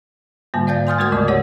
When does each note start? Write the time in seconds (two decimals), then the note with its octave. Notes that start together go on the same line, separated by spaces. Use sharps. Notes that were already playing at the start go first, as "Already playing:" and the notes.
0.54 G#2 D3 G3 A#3
0.67 D5 F5 G6 A6
0.87 G#5 C6 D#6 F6 G6 A6
0.99 G#3 A3 F#4 A#4 D#6 G#6
1.11 D2 G#2 C#3 D5
1.28 G4 C#5 F#5